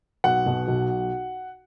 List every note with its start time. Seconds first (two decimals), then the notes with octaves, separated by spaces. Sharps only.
0.24 B1 F#5
0.46 B2
0.68 B1